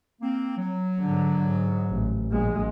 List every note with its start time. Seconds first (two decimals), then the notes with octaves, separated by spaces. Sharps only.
0.22 A#3 C4
0.58 F#3
1.01 G#2 D3
1.42 G#2
1.91 A1
2.32 A#1 G#3